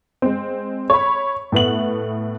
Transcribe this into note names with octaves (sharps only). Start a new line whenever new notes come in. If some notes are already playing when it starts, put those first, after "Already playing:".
G#3 C4
C#5 B5
A2 A3 B3 F#5 F#7